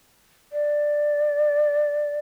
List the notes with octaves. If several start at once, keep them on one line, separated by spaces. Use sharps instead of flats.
D5